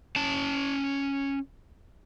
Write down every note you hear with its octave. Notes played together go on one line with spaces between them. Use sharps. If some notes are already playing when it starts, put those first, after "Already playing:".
C#4 A5